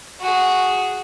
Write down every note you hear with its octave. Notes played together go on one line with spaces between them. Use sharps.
F#4 G#4